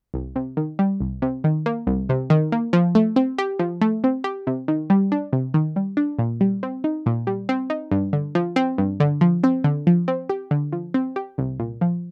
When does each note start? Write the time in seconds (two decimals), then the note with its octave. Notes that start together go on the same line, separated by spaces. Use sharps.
0.14 C2
0.36 C3
0.57 D#3
0.79 G3
1.01 C2
1.22 C3
1.44 D#3
1.66 A#3
1.87 C2
2.09 C3
2.30 D#3
2.52 A#3
2.73 F3
2.95 A3
3.16 C4
3.38 G4
3.59 F3
3.81 A3
4.04 C4
4.24 G4
4.47 C3
4.68 D#3
4.90 G3
5.12 D4
5.33 C3
5.54 D#3
5.76 G3
5.97 D4
6.19 A#2
6.41 G3
6.63 C4
6.84 D#4
7.06 A#2
7.27 G3
7.49 C4
7.70 D#4
7.91 G2
8.13 D3
8.35 F3
8.56 C4
8.78 G2
9.00 D3
9.21 F3
9.44 C4
9.64 D3
9.87 F3
10.08 C4
10.29 G4
10.51 D3
10.73 F3
10.94 C4
11.16 G4
11.38 C2
11.59 A#2
11.81 F3